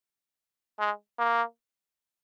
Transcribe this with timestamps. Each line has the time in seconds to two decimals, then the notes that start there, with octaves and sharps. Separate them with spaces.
0.79 G#3
1.19 A#3